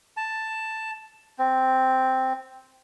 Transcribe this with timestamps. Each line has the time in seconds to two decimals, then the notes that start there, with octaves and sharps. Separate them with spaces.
0.17 A5
1.39 C4